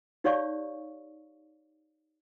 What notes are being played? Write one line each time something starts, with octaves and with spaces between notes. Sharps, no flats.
D#4 G4 C#5 D5 F5 C#6